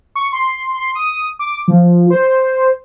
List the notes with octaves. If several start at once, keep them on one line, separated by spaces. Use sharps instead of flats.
C#6
C6
C6
D#6
D6
F3
C5